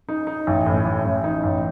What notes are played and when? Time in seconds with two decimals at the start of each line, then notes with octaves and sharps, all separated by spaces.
0.09 C#4 D#4
0.27 D#4
0.47 A1
0.66 A2
0.85 A1
1.05 A1
1.24 D#4
1.43 A1